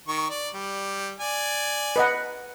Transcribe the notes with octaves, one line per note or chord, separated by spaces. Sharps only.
D#3 C#6
D5
G3
D5 G#5
B4 D#5 F#5